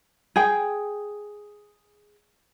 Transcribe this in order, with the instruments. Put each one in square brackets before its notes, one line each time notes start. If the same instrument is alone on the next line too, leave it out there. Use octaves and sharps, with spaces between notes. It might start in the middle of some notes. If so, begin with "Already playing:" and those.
[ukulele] G#4 G5